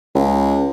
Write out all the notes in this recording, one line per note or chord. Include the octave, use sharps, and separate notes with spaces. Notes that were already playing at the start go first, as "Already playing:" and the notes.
C#2